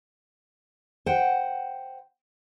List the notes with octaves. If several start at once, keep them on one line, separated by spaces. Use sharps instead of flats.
C5 F#5 G5